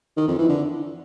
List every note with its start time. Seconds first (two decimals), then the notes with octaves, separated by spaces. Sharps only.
0.17 D#3
0.28 F2
0.38 E3
0.49 D3